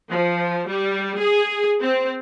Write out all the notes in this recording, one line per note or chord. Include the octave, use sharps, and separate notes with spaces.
F3
G3
G#4
C4